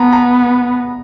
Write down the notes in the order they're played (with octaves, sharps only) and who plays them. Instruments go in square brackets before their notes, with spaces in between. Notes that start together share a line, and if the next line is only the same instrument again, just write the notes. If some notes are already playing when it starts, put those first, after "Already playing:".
Already playing: [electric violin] B3 [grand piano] A5 A#5
[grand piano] A#5